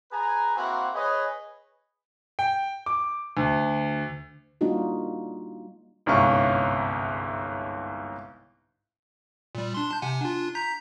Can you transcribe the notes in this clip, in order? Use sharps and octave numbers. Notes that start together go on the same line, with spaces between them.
G#4 B4 G#5 A#5
A#3 C4 E4 F#4 F#5
G#4 B4 C#5 D#5
G5
D6
D2
G3 A#3 D4 D#4 F4 F#4
G1 C2 G#2 C#4 F5 C#6
A#2 G3
D4 C6
A5 G6
C3 F#5 G#5
D4 F4
A#5 G6 B6